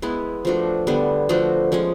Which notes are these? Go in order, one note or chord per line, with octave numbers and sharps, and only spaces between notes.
G#3 B3 E4
F3 A3 D4 F#4
D3 G3 B3
F3 A3 D4 F#4
F3 G#3 C#4